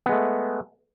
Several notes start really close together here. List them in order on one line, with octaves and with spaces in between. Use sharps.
B3 G#3 A3